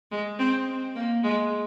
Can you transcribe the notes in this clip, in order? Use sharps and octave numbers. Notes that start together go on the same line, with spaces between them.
G#3
C4
A#3
G#3